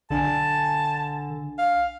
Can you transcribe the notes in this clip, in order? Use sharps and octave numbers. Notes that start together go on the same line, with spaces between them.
B1 D3 D4 G#5 A5
F5